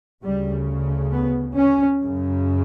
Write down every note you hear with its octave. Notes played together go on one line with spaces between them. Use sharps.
D2 C#3 G3
B3
C#4
F#2 C#3